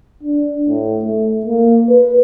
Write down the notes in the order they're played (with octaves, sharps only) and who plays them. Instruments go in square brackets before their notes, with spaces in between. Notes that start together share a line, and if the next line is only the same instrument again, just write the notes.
[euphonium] D4
A2
A3
A#3
B4